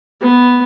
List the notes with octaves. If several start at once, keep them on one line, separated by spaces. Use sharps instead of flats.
B3